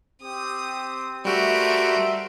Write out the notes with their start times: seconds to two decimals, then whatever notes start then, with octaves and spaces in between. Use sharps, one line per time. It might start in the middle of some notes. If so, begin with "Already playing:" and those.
0.22 C4 G4 D#6
1.25 G3 A3 F#4 G4 A#4 C5 E5 D7